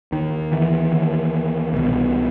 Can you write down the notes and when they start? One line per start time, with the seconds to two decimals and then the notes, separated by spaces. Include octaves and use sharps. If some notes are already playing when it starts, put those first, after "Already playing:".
0.12 D#2 D#3
0.52 E3
0.93 D#2
1.73 C2 B2